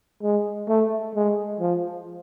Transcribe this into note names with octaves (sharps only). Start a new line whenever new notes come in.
G#3
A3
G#3
F3